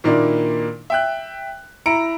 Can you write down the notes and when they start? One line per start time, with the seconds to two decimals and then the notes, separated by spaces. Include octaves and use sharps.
0.04 A#2 D#3 A#3 D4 E4
0.90 E5 G5 F#6
1.86 E4 A#5 C#7 D7